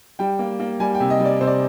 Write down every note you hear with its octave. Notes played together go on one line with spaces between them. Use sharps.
G3 G5
A#3
A#3
G3 G#5
G5
C3
D#5
G3
D5
C3 C5
D5